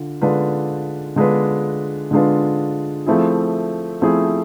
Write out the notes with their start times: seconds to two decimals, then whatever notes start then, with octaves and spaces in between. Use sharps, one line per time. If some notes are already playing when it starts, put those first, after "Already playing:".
Already playing: D3 F4
0.21 D3 G#3 D4 F4 B4
1.16 D3 G#3 D4 F4 B4
2.11 D3 G#3 D4 F4 B4
3.06 F3 A3 C4 E4 G#4
4.02 F3 A3 C4 E4 G#4